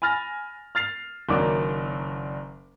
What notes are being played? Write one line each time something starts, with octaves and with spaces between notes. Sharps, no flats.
G#5 B5 F6 A6 A#6
F6 A6 C7 F7
F#1 D#3 F#3 A#3 D4 D6